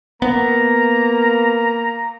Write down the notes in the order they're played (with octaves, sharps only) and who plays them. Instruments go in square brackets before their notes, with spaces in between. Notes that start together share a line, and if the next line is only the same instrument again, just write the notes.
[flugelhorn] A#3 [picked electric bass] B3 [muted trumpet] A#5